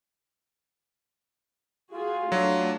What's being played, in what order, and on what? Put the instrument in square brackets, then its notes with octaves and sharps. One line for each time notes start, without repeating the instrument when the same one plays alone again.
[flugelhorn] F4 [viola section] F#4 G#4
[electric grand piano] F#3 [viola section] A3 D4